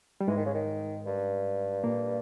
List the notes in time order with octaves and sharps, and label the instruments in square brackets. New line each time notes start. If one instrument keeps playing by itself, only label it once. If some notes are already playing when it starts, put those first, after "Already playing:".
[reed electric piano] G3
[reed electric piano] G#2 G#3 [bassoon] E3
[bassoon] D#3
C#3
D#3
G2
[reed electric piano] A#2 A#3